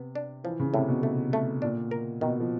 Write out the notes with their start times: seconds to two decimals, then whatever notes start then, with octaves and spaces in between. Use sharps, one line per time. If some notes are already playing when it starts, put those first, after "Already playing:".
Already playing: C3 B3
0.15 D4
0.44 E3 F3
0.60 C#3
0.74 A2 C3
0.88 B2
1.03 A3
1.33 A3
1.62 A#2 D4
1.91 A#4
2.21 B2 D#3
2.40 F3